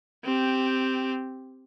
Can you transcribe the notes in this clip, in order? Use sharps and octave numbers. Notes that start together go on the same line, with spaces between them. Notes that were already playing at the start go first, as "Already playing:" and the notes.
C4 G4